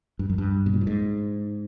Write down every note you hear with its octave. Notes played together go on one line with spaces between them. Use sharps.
G2
F#2
G2
B2
A#2
A2
G#2